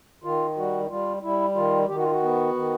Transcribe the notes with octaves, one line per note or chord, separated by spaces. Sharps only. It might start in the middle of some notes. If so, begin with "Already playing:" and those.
D#3 F4
G3 F#4
G3 F4
G3 E4
D#3 F4
D#3 G4
F#4
F4
F#4
B3
D#3